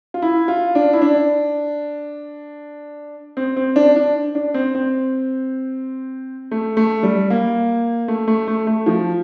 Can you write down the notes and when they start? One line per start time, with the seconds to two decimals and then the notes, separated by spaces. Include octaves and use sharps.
0.14 F4
0.22 E4
0.48 F4
0.75 D4
0.93 E4
1.02 D4
3.37 C4
3.57 C4
3.76 D4
3.96 D4
4.35 D4
4.54 C4
4.75 C4
6.51 A3
6.77 A3
7.03 G3
7.30 A#3
8.08 A3
8.28 A3
8.48 A3
8.67 A3
8.86 F3